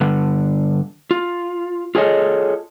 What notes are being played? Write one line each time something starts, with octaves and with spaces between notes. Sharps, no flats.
G2 D3
F4
F4 G#4 A4 C#5 D#5